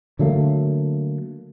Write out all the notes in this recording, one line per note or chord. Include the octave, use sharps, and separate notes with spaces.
D3 F#3 A3 A#3